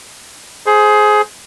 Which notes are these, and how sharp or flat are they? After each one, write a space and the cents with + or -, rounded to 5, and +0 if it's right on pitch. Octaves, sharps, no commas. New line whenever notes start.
G#4 +20 C5 +0